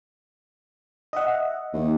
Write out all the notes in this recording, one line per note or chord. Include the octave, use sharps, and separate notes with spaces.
D#5 E5 F#5
D#2